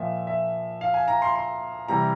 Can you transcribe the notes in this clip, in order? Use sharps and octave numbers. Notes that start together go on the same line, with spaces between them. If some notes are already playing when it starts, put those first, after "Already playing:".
Already playing: A#2 F3 E5
E5
F5
G#5
A#5
C6
C6
C3 E3 G3 A#5